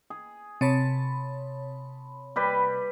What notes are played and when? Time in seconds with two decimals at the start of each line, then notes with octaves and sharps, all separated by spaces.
0.10 G#4
0.61 C3 C#5 A5 B5
2.36 G3 G4 B4